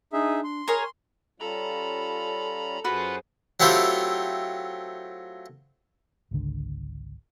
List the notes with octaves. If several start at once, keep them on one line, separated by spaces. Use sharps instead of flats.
D4 D#4 G#4 E5
C6
G#4 A#4 C#5
G3 C#4 F4 A4 A#5 B5
F#2 F4 F#4 G#4 B4 C5 F#5 B5
F#3 A3 C4 E4 F4 G4
G#1 C#2 D3